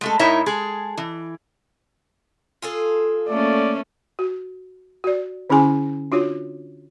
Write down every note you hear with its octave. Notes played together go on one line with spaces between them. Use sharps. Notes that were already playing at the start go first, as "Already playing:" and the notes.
G#3 A3 A4
A2 D#4 E4 A#4 C#5 E5
G#3 G#4 A4
E3
F4 G#4 A4
A3 A#3 C#4 D5
F#4
F#4 D5
D3 C#4 E4 G#4 G#5 C6
D4 F4 F#4 C#5